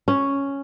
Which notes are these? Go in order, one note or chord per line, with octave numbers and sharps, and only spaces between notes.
C#4